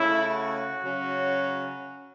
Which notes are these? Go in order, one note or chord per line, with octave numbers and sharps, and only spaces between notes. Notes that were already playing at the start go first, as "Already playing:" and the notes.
Already playing: C#3 A3 C#4 E4
F#4
C#3 F#3 C#4